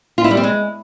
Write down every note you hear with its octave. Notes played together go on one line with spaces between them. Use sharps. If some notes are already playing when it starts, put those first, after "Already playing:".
F4
E4
G3
C4
G#3